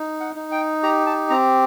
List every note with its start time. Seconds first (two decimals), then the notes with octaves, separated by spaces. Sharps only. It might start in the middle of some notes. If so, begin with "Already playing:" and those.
Already playing: D#4
0.20 F#5
0.36 D#4
0.52 G5
0.83 G4 A#5
1.06 A5
1.30 C4 A#5